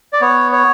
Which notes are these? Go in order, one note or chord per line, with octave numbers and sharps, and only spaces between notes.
D5
B3 C#5
C#5